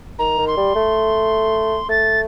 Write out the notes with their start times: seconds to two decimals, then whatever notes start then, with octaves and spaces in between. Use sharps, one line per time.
0.18 D#3 A#5
0.38 D#3
0.47 C6
0.57 G3
0.75 A3
1.89 A3 A6